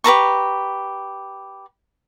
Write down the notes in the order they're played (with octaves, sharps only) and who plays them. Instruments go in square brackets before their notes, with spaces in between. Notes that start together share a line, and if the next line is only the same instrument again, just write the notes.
[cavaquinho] G4 B4 A#5 C#6